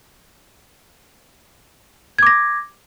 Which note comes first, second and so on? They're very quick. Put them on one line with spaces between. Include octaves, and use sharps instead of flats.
G#6 D6 A#6